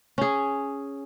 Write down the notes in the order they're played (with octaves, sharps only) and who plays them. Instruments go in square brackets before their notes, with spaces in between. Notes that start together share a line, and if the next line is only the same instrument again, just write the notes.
[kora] C#4 G#4